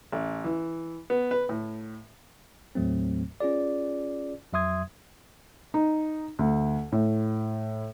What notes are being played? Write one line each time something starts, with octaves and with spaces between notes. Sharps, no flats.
A1
E3
B3
B4
A2
D#2 A2 F#3 A3 C4
C#4 F4 G#4 D5
F2 F#3 E5 C6 D#6 G#6
D#4
D2
A2